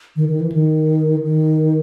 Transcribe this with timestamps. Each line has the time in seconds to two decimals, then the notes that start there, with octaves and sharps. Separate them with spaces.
0.16 D#3
0.28 D#3
0.40 E3
0.52 D#3
1.23 D#3